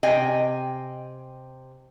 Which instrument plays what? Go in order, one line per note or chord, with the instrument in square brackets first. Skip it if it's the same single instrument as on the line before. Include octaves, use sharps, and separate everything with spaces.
[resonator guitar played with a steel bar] C3 D#5 G5 G#5